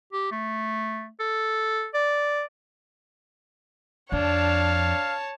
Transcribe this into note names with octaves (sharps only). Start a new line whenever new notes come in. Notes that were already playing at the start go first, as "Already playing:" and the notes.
G4
A3
A4
D5
F2 D4 C#5 F5 A5